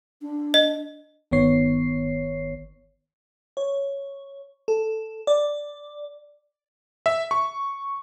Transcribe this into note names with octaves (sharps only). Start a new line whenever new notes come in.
D4
D#5
G1 D#3 B3 C#5 C7
C#5
A4
D5
E5
C#6